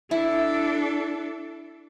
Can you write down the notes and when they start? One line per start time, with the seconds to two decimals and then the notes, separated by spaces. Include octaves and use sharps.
0.11 D4 E4 A4